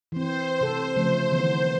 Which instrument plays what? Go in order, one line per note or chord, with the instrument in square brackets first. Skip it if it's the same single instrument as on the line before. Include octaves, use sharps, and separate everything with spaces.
[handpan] E3 C4 [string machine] C5
[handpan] C3 A4
C#3 F3 A3
D#3 E3 B3